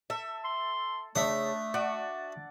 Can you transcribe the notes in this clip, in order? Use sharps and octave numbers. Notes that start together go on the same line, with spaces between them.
A4 E5
C6
C#3 A3 D4 E5 D#6
F#4 D5 F#5